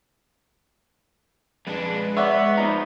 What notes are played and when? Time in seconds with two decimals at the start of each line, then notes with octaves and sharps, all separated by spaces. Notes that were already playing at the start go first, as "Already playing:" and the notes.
1.67 F2 G#3 D4 B4
2.17 B3 C#5 D5 E5 F#5
2.57 F3 B3 D#4 A#5